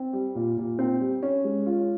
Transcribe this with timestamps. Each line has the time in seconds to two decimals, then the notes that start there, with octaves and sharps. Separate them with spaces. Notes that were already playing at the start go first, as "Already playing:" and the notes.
Already playing: C4
0.13 G3
0.35 A#2
0.57 A#2
0.79 C4
1.01 G3
1.23 C#4
1.44 G#3
1.67 F4